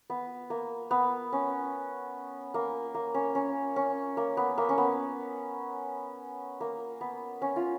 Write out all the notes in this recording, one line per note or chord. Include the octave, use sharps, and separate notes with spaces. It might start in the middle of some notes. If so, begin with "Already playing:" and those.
B3
A#3
B3
C#4
A#3
A#3
C#4
C#4
C#4
A#3
B3
A#3
C#4
B3
A#3
B3
C#4
F4